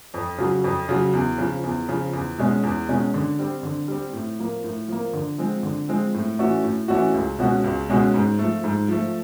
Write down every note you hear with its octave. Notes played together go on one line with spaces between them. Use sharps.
F2
C#3 F#3
F2
C#3 F#3
E2
C#3 F3
E2
C#3 F3
E2
B2 G#3 C#4
E2
B2 G#3 C#4
D3
G3 C4
D3
G3 C4
A2
F3 A#3
A2
F3 A#3
D3
F3 G#3 C4
D3
F3 G#3 C4
A2
E3 A3 C#4 F#4
A2
E3 A3 C#4 F#4
C#2
B2 G#3 C#4 F#4
C#2
B2 G#3 C#4 F#4
G#2
F3 A3
G#2
F3 A3